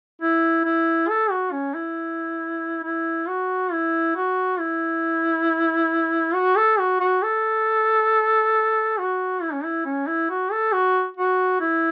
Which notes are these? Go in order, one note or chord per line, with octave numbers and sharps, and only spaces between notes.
E4
E4
A4
F#4
C#4
E4
E4
F#4
E4
F#4
E4
F#4
A4
F#4
F#4
A4
F#4
E4
C#4
E4
C#4
E4
F#4
A4
F#4
F#4
E4